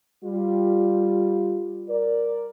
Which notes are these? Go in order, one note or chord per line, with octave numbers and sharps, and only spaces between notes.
G3 F4
A#4 D5